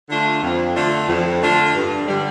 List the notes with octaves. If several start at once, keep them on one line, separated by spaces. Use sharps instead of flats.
D3 A3 D4 F4
F2
D3 A3 D4 F4
F2
D3 A3 D4 F4
G2
D3 G3